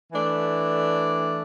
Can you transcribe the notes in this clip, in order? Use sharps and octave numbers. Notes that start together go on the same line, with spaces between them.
E3 A3 D4